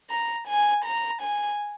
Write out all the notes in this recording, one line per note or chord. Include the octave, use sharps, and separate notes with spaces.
A#5
G#5
A#5
G#5